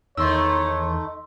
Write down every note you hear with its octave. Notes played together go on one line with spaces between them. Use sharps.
E2 D#3 A3 C#5 C6 E6